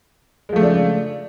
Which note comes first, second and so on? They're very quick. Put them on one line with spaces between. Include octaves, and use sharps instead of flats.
G#3 F3 A3 C#3 D4